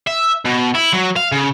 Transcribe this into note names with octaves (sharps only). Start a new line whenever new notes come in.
E5
B2
E4
F#3
F5
C#3